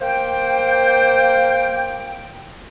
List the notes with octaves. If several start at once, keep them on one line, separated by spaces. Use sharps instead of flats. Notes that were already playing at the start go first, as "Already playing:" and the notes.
A#3 C5 G5